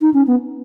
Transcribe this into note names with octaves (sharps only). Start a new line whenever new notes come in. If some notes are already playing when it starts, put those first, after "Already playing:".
D#4
C#4
B3